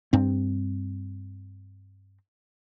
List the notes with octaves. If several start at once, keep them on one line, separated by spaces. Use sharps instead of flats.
G2 C4